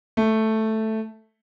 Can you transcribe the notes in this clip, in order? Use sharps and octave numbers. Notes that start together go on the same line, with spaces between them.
A3